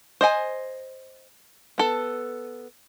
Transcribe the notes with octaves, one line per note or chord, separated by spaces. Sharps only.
C5 D#5 G#5
B3 A4